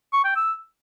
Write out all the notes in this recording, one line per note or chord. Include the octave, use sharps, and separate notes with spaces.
C#6
G5
E6